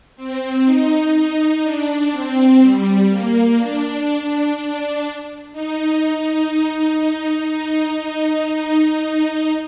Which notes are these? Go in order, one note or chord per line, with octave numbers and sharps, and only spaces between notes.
C4
D#4
D#4
D4
C4
G3
A#3
D4
D4
D#4
D#4
D#4
D#4